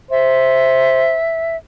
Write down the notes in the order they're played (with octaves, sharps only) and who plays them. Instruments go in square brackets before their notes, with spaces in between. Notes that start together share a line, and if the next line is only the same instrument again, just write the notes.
[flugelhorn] C5 [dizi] E5